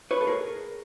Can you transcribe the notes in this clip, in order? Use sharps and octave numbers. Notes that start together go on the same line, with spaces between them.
B4 C#5
A4
G#4 A#4